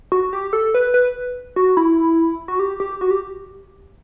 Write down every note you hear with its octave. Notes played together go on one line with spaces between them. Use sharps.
F#4
G4
A4
B4
B4
F#4
E4
F#4
G4
G4
F#4
G4